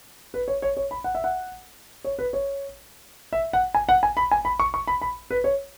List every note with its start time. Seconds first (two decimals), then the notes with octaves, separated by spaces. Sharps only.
0.34 B4
0.48 C#5
0.62 C#5
0.77 C#5
0.91 B5
1.04 F#5
1.15 E5
1.24 F#5
2.04 C#5
2.19 B4
2.33 C#5
3.33 E5
3.53 F#5
3.75 G#5
3.89 F#5
4.03 G#5
4.17 B5
4.31 G#5
4.45 B5
4.60 C#6
4.74 C#6
4.88 B5
5.02 B5
5.31 B4
5.44 C#5